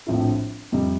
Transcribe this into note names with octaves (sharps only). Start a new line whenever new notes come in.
A#1 A2 F3 C4 E4
F2 C3 G3